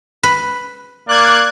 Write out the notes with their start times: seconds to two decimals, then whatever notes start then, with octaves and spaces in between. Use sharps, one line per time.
0.23 B4
1.09 A#3 D5 F#6 G#6